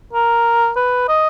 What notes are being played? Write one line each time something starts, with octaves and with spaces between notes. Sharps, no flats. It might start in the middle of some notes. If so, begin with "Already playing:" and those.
A#4
B4
D#5